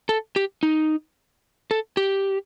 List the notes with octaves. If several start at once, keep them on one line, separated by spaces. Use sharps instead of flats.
A4
G4
D#4
A4
G4